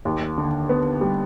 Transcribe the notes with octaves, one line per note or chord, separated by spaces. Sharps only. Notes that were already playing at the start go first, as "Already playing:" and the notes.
D#2
D3
B3
G3